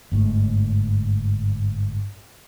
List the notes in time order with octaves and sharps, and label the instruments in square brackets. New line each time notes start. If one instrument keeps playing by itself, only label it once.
[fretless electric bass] G1 G#2 A3